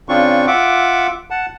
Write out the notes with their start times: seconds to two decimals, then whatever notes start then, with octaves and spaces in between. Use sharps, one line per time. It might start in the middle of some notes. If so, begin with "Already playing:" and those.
0.09 C#3 C4 D4 F4 C#6
0.47 F4 E5 F#5 D6
1.31 F#5 A5